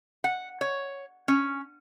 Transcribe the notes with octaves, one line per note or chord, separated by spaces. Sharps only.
F#5
C#5
C#4